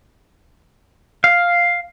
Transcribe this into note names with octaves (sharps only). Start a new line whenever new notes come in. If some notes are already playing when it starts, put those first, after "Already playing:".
F5